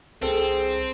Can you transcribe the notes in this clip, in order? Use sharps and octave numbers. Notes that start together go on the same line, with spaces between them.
C2 C4 G#4 A4